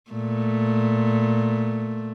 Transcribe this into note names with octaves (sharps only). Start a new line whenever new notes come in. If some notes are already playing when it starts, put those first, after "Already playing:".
A#2 A3